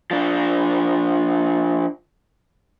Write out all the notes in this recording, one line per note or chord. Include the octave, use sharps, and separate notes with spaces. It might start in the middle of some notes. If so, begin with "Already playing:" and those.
F3 D4